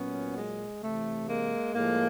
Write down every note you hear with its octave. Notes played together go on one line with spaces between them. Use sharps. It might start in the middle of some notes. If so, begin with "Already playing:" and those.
Already playing: A#2 F#3 B3 C#4
G#3
C3 E3 A3
G#3 A#3
A2 F3 G#3 A#3